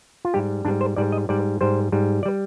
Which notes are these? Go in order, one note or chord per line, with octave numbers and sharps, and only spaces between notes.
F4
G#2 G3 G4
G#2 G3 D4
C5
G#2 G3 D5
D#5
G#2 G3 D5
G#2 G3 C5
G#2 G3
D5
G3